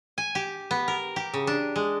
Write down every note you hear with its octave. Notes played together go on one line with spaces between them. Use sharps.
G#5
G4
B3
A#4
G4
C#3
D4
G#3